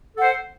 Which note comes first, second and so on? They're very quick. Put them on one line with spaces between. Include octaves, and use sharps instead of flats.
A4 F#5 C5